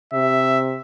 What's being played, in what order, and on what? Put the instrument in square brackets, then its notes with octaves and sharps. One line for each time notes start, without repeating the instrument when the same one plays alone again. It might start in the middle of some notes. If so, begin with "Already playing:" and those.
[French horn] C3 [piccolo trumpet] E5